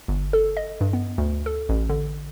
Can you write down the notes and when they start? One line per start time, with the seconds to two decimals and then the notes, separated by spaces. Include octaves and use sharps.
0.08 G1
0.33 A4
0.57 D#5
0.81 G2
0.93 B3
1.18 D2
1.46 A4
1.69 A1
1.89 D3